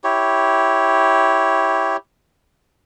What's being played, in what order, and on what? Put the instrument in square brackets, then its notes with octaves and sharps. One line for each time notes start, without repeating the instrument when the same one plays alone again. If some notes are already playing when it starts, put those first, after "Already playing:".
[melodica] E4 G4 C#5